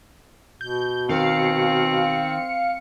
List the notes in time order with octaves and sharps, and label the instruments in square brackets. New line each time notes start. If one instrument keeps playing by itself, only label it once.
[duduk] B2 [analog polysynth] G6
[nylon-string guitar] D#3 [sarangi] C4 [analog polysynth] F5 C#7